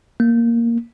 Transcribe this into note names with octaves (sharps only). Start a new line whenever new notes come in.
A#3